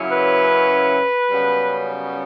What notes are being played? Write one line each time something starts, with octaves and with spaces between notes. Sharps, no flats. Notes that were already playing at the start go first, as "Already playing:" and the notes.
Already playing: F#2 C#3 F#3 C#4 E4
B4
F#2 C#3 G3 B3